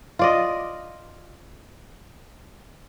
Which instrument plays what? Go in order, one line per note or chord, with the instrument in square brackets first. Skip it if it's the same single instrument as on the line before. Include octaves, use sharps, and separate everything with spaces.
[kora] F4 D5 D#5